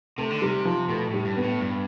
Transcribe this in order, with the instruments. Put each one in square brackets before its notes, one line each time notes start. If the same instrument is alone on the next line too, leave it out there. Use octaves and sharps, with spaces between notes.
[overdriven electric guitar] C3 [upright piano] A3
[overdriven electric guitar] D3
[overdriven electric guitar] C3 [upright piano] G3
[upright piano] F3
[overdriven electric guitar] B2 [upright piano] A3
[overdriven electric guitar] A2
[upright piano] G3
[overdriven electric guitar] G2
[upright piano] B3
[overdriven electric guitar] A2
G2